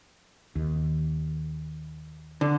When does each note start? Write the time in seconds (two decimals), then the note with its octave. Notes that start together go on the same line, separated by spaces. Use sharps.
0.56 D#2
2.41 D3